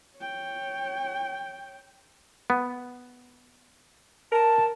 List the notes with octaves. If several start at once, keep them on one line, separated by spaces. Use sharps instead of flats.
C#5 G5
B3
A#4 A5